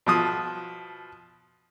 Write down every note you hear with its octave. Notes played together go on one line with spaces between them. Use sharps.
B2 F3 D#6